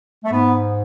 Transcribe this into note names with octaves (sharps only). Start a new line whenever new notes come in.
A3
G#2 B3